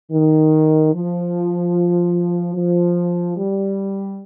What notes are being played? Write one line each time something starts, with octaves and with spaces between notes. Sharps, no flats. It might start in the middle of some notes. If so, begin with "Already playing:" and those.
D#3
F3
F3
G3